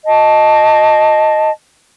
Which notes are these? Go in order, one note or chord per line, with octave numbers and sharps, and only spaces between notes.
D#5 A5